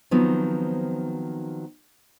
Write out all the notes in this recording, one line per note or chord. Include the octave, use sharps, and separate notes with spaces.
D#3 F3 F#3 B3 C4 D#4